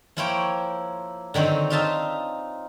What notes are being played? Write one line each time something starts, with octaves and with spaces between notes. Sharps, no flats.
F3 A#3 E4 C5 C#5 G5
D3 D#3 F#3 C4
D#4 F4 E5 F5 A5